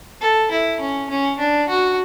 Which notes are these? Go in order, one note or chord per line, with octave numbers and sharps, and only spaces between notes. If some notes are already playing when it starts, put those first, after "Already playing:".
A4
E4
C#4
C#4
D4
F#4